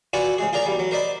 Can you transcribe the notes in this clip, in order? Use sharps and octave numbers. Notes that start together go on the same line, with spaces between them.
F4 F#4 B4 D5 F#5 G#5
C#3 G#3 G#4
F4 G#4 A#4 D5 A#5
B1 G3
F#3
A#4 C5 D5 D#5 B5